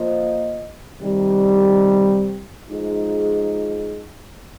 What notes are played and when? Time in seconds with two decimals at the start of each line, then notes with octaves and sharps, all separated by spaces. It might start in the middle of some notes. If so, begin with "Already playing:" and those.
Already playing: F3 A#3 F4 C5 D#5
1.00 C3 D#3 G3
2.70 F3 G#3 D#4 G#4